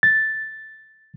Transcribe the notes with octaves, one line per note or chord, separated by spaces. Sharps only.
A6